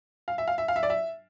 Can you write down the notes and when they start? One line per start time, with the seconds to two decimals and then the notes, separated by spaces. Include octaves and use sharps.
0.28 F5
0.38 E5
0.48 F5
0.58 E5
0.68 F5
0.76 E5
0.83 D5
0.90 E5